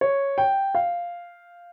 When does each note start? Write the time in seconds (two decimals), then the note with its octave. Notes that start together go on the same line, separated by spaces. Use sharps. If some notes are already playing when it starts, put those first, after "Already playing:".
0.01 C#5
0.38 G5
0.75 F5